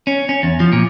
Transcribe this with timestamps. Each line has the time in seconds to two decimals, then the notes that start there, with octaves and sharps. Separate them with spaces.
0.07 C#4
0.29 C#4
0.43 E2
0.60 F3
0.73 A#2